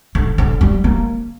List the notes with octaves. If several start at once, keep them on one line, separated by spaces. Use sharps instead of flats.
D3
D3
G3
A#3